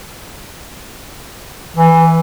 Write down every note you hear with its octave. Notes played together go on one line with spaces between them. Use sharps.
E3